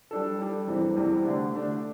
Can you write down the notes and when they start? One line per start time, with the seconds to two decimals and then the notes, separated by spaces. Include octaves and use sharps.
0.11 G3 D4 A4
0.39 G3 D4 A4
0.67 E2 C3 E3 G3
0.96 E2 C3 E3 G3
1.24 D3 A3 D4
1.52 D3 A3 D4